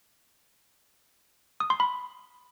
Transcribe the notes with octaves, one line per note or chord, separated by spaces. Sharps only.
D#6
C6
B5